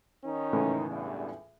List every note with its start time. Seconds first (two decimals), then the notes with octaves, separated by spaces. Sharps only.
0.24 D#3 C#4 D#4
0.53 C#2 A2 E3
0.88 E2 G2